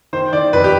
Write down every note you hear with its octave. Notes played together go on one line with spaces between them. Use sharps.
D#3 C5
D#3 D5
F2 B4
G4